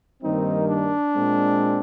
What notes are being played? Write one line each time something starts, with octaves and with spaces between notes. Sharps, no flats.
G2 D#3 G3 A#3 C4 D#4
D4
A#2 G#3 C4